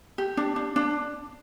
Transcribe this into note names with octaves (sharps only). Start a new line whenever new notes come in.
G4
D4
D4
D4